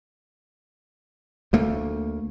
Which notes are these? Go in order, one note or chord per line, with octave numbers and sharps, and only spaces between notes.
D2 A3 A#3